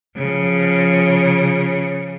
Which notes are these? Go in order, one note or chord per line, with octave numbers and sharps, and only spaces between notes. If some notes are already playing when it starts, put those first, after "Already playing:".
C#3 F3